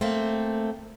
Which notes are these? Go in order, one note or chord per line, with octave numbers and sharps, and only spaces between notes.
A3 A#3 C4